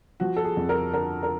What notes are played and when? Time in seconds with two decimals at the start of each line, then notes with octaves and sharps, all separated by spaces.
0.20 F3 F#4
0.37 A4
0.45 G#4
0.57 F2
0.69 A#4
0.94 D3 A#4
1.23 A#4